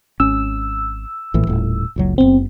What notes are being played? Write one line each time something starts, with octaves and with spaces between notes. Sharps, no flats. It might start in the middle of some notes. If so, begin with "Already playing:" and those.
G#1 C#4 E6
A#1 A2 E3
D#1 A2
F#1 C#2 F#3
F#1 G2 B3 C4